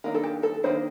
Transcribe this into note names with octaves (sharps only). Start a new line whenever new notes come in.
D#3 A#3 D4 A#4
A4
G4
A4
D#3 A#3 D4 C5